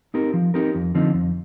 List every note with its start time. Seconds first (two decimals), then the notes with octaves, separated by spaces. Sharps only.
0.14 C4 D#4 G4 A#4
0.34 F3
0.54 C4 D#4 G4 A#4
0.75 F2
0.95 D3 F3 C4 D#4
1.14 F2